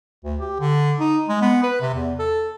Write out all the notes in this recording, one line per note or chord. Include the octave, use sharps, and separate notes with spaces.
D2
G4
D3
D#4
G#3
B3
B4
C3
E2
A4